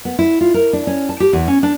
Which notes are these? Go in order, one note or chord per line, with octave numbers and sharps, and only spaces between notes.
B3
E4
F4
A#4
D4
C#4
A5
G4
E2
C#4
D4